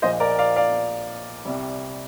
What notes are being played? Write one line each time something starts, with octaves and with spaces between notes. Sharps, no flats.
A#1 A#2 F3 C5 D#5
A#4 D5
D5 F5
D5 F5
C2 C3 G3